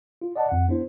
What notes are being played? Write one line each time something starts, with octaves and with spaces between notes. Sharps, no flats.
F4
D5 D#5 F#5 A5
F2 F#5
B3 D4 E4 C5